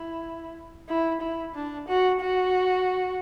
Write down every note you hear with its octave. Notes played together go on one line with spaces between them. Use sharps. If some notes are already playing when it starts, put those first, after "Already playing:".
Already playing: E4
E4
E4
D4
F#4
F#4